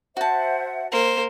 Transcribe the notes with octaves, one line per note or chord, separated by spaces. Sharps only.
F#4 C5 E5 F#5 A5
A#3 C5